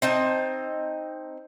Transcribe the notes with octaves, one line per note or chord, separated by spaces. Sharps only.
C4 D#4 A5